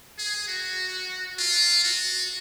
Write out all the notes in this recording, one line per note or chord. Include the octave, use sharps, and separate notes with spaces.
G#4
F#4
F4
F#4